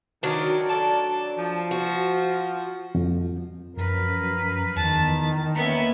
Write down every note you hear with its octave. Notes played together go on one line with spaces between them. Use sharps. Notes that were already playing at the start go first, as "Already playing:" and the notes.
D#3 F#3 D4
A4 D5 A5
F3
F#4
F2
F#2 F3 A#4 B4
E2 D#3 A5
A#3 B3 C#4 B4 E5